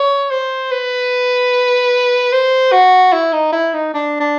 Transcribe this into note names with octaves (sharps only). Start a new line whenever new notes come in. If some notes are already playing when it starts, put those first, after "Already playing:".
Already playing: C#5
C5
B4
C5
F#4
E4
D#4
E4
D#4
D4
D4